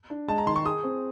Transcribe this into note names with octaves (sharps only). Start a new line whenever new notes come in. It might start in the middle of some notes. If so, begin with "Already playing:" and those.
D4
G#3 A5
A#5
D#3 C6
C#6
G#4 D#6
C4